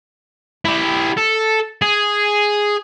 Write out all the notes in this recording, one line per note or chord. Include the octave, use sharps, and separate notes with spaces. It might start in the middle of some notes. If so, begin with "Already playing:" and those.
E4 G4
A4
G#4